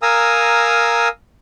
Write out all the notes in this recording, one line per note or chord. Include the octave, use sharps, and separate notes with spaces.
A#4 F5 G#5 A#5 D#6 E6